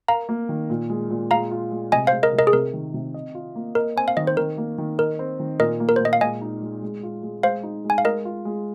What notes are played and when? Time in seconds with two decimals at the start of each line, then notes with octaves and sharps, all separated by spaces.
0.08 A#4 F5 A#5
0.29 A#3
0.49 D#3
0.70 A#2
0.90 G#3
1.10 A#2
1.31 G#3 F5 A#5
1.51 F4
1.72 G#3
1.92 C3 D#5 G#5
2.07 G#3 C5 F5
2.23 A#4 D#5
2.33 C3
2.39 A#4 D#5
2.47 G#4
2.53 C3 A#4
2.73 D#3
2.94 C3
3.14 D#5
3.35 F4
3.55 A#3
3.75 A#4 D#5
3.96 C4 G#5
4.08 F5
4.17 D#3 D#5
4.27 C5
4.37 D#3 A#4
4.58 A#3
4.78 D#3
4.99 A#4 D#5
5.19 C4
5.40 D#3
5.60 A#2 A#4 D#5
5.80 A#3
5.89 A#4
5.96 C5
6.00 A#2 D#5
6.13 F5
6.21 G#3 D#5 G#5
6.41 D#4
6.62 G#3
6.82 G#3
7.03 F4
7.23 G#3
7.43 G#3 C5 F5
7.63 D#4
7.84 G#3
7.90 G#5
7.98 F5
8.05 G#3 A#4 D#5
8.25 F4
8.45 G#3